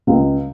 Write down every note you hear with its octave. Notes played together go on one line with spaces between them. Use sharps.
C#2